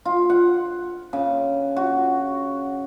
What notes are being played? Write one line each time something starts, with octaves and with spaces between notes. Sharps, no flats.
F4
F#5
C#3
F#4